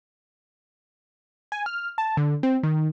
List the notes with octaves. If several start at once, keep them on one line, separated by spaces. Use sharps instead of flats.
G#5
F6
A5
D3
C4
D#3